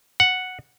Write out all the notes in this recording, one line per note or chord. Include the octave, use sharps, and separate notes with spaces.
F#5